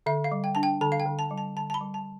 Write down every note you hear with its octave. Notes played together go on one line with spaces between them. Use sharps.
D3 E5
F5
G3
G5
D4 A5
G5
D3 A5
F5
G5
D3
A5
G3
A5
D3 A5
A5
B5
G3
A5